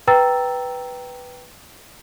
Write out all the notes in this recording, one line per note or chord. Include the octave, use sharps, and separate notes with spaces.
B4 G5 A#5 E6 A6